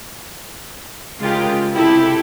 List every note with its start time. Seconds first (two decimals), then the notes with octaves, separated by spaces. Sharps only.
1.20 C#3 G#3 F4 G4 A#4
1.73 C3 E4 G4 A4